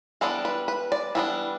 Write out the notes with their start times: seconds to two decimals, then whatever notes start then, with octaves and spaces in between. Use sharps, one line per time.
0.21 E3 G3 B3 D4 A4
0.45 B4
0.68 B4
0.92 D5
1.15 E3 G3 B3 D4 E5